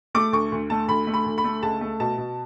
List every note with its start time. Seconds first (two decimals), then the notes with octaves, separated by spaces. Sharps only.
0.15 A3 D6
0.32 D2 C#6
0.52 D2
0.70 A3 A5
0.88 D2 B5
1.07 A3
1.14 B5
1.26 D2
1.38 B5
1.44 A3
1.62 C#2 A5
1.81 A3
2.00 B2 A5
2.18 B2